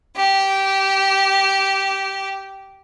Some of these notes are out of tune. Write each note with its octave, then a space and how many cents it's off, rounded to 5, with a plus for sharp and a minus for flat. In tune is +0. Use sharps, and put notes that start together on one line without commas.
G4 -15